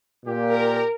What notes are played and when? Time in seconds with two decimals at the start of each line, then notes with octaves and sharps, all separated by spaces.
0.24 A#2 A#3 G4
0.53 A#4